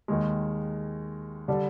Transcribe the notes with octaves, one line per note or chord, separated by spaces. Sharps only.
D#2 D#3 G#3
D3 G3 D4